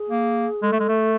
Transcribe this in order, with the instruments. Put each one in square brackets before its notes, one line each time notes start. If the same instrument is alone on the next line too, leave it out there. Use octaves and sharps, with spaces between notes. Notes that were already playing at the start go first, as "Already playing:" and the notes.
Already playing: [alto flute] G#4
[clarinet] A#3
[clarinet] G#3 [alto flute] A4
[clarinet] A3
G#3
A3